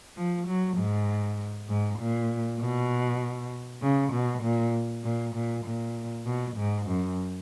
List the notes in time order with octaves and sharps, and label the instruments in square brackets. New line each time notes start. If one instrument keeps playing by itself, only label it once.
[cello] F3
F#3
G#2
G#2
A#2
B2
C#3
B2
A#2
A#2
A#2
A#2
B2
G#2
F#2